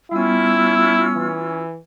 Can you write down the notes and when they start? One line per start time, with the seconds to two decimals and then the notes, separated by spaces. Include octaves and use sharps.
0.11 G3 B3 C#4 E4 F4 E6
1.16 E3